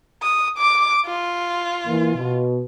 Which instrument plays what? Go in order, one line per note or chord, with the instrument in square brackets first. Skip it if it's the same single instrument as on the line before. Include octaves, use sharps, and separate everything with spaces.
[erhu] D#6
D6
F4
[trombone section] A#2 E3
B2